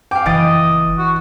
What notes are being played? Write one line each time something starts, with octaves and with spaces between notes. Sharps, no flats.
F5 G5 G#5 D6
F#1 E3 D#5 A6 D7
F#4